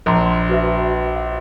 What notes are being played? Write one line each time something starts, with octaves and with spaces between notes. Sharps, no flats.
A#1 D5 A#5 C6
F#4 B4 E5
F5